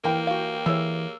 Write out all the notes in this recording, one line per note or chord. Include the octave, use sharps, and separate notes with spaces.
E3 A#3 A#4 G5
F#4 F5
E3 G4 G#4 C#5 E6